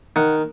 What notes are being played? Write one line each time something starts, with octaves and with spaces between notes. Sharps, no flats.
D#3 F#5